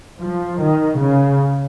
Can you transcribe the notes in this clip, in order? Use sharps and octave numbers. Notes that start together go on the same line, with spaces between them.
F3
D#3
C#3